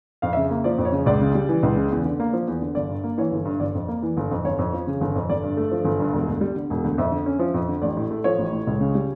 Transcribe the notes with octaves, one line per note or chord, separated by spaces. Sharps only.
F2 F5
C#3 E5
A#3
F3 D5
F2
C#5
C#3
C#2 D5
C#3
G3
E3
C#2
C#3
E2
D3
A#3
F3
E2
D3
G1 D5
G2
A#3
E3 C#5
G1
G2
G1 D5
F2
A#3
E3
G1
F2
G1 C#5
F2
F3
C#3
G1
F2
G1 D5
G2
A3
F3
G1
G2
E1
D2
G3
D3
E1
D2
F2 E5
D3
C#4
F3
F2
D3
A1 D5
A2
A3
F3 C#5
A1
A2
C#2
C#3
G3